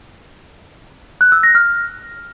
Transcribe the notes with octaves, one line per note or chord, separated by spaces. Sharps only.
F#6
E6
A#6
F6